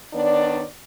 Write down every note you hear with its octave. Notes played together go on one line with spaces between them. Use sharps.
D#3 B3 D4 C#5 D5